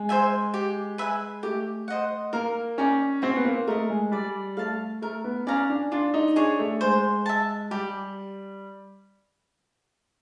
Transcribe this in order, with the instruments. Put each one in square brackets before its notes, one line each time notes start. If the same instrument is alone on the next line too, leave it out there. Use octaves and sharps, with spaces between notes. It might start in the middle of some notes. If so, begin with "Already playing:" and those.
Already playing: [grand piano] G#3
[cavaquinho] C5 E5 G#5
G4
B4 E5 G#5
[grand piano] A3 [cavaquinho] G4
[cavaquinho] C5 D#5 F#5
[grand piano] A#3 [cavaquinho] A#4
[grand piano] C#4 [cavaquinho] D5 G5 A#5
[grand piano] C4 [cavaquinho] F#4
[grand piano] B3
A#3
[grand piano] A3 [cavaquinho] A#4 D#5
[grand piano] G#3
[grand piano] G3 [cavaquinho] D5
[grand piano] A3 [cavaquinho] F5 A5
[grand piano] A3 [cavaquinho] A#4
[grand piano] B3
[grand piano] C#4 [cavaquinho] D5 F5 A#5
[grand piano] D4
[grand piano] D4 [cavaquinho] F4
[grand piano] D#4
[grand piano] D4 [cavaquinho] G#4 C#5
[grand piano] A3
[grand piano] G#3 [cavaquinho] C5
[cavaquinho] E5 A5
[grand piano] G3 [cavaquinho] G4